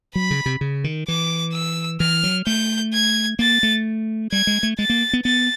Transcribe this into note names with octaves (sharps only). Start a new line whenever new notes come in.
F#3 B5
C#3
C3
C#3
D#3
E3 D6
E6
E3 F6
F#3
A3 G6
G#6
A#3 A6
A3
G3 G#6
G#3
A3
G#3 A6
A#3
B3
B3 A6